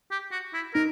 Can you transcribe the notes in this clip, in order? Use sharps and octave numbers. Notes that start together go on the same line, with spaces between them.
G4
F#4
E4
D#4 A#4